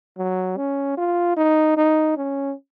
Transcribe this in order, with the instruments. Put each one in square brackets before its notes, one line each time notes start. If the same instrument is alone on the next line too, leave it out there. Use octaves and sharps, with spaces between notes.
[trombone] F#3
C#4
F4
D#4
D#4
C#4